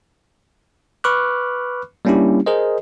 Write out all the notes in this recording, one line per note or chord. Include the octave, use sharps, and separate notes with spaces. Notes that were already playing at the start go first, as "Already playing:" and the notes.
B4 B5 C#6 D6 F6 F#6
G3 A#3 C#4 D4 E4 G4
G#4 A#4 C5 D#5